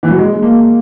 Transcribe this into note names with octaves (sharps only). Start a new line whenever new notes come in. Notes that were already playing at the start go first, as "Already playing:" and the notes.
E3
F#3
G#3
G#3
A#3
A#3